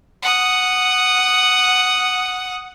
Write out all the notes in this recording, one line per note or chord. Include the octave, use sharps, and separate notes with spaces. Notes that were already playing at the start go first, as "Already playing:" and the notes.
F#5 D#6